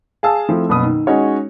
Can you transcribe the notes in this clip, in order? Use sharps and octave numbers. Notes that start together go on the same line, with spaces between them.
G#4 F5 A5 E6
F3 A3 C4 E4
F#1 B2 B5 D#6
D#3
G#3 C#4 D#4 F#4 C#5